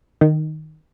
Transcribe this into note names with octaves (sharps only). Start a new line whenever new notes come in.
D#3